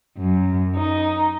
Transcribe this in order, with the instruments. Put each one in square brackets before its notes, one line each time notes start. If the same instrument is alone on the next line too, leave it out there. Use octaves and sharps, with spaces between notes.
[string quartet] F#2
D#4